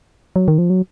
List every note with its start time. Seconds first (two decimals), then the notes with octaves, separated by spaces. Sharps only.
0.36 F#3
0.48 D#3
0.58 F3
0.70 F#3